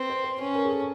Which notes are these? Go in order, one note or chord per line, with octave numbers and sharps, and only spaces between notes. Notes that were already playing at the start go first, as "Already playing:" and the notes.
Already playing: C4 B4
C5
C5
C#4 B4
A#4
G#4
A4